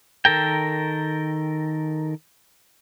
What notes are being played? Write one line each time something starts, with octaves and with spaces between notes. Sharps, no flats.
D#3 A4 A#4 G5